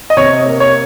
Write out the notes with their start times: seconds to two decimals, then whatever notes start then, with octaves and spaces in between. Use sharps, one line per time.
0.10 D#5
0.17 C3 C#5
0.46 A#3
0.60 C#5